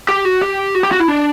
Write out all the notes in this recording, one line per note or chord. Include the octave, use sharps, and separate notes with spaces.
G4
F#4
G4
F#4
G4
F#4
E4
D4